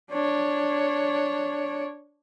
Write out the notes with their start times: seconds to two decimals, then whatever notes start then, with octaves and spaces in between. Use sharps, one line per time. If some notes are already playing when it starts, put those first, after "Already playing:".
0.11 D4 C#5